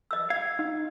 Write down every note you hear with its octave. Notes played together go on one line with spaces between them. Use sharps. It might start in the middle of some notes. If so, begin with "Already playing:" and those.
D#5 E6
F5 G#6
D#4